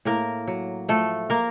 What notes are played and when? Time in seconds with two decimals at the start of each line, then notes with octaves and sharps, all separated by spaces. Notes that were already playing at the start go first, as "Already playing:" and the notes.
0.05 A2 A#3 A#4
0.47 F#3
0.88 F3 A3 A4
1.30 A#3 A#4